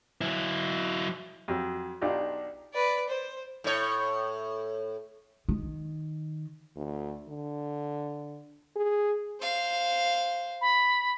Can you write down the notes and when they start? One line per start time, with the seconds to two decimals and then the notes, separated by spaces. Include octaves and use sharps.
0.22 F#3 E4
1.48 F2 F#3
2.01 B1 D4 D#4 F4 G4
2.74 B4 D5
3.09 C5
3.64 A2 C#5
5.49 D#3
6.76 D2
7.29 D3
8.76 G#4
9.41 C5 F5
10.61 B5